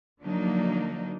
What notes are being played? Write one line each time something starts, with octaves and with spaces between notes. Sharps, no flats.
D3 F3 F#3 A#3 D4 D#4